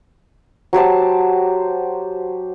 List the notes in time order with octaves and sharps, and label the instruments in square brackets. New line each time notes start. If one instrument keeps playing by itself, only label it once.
[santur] F#3 G4 C5 A5